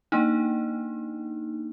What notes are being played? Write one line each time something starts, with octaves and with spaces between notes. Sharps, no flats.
A#3 D4 D#4